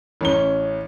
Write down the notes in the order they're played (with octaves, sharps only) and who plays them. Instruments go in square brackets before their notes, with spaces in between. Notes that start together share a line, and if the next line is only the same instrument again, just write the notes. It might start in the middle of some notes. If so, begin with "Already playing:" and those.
[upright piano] A1 C#4 G7